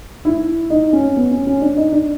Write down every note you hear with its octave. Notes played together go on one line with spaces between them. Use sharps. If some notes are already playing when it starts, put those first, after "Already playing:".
E4
D#4
C#4
B3
C#4
C#4
D4
D#4
D4